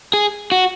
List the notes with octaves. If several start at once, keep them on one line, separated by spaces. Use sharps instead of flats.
G#4
F#4